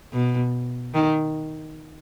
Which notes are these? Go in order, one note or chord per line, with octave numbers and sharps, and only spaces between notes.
B2
D#3